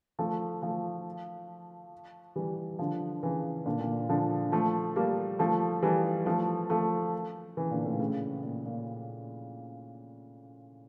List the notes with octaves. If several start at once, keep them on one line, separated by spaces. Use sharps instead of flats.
F3 A3
F3 A3
E3 G3
D3 F3
C#3 E3
A#2 D3
A#2
D3 F3
F3 A3
G3 A#3
F3 A3
E3 G3
F3 A3
F3 A3
C#3 E3
A#2 D3
A2 C#3
A2 C#3
A#2
A#2